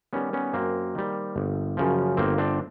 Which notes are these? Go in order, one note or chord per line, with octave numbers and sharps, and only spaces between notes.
D#3 G3 B3 C#4
B3 C#4
F#2 A#3 C4
D#3 G3
G1
F#2 C#3 F3
G1 A#3 C4
C4 D4